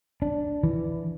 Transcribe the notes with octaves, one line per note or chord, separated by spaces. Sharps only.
D4
E3